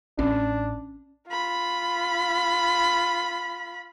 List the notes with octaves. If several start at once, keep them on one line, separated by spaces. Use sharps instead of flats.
A1 C#4 D4
F4 B5